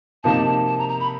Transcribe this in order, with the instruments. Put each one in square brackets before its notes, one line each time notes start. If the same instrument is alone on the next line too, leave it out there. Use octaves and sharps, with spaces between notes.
[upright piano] C3 F3 A#3 D#4 [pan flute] A5
[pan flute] A5
A#5
A#5
B5